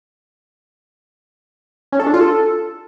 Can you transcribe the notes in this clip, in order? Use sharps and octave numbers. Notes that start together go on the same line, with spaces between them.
C#4
A4
D4
F4
A4